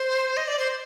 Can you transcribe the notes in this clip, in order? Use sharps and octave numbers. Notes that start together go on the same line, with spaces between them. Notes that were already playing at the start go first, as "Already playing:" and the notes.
Already playing: C5
D#5
D5
C5
C5